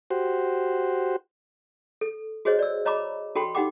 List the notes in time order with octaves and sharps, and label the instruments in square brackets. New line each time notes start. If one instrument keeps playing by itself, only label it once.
[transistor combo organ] F#4 G4 C5
[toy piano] A4
F#4 G#4 C5 C#5 D#5
D5 E6
C#5 D#5 A#5 B5 D6
C#4 F#4 A4 G5 B5 C6
D#4 G4 F#5 G5 D6